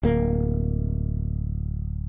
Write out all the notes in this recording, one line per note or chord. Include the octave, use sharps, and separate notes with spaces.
D1 A#3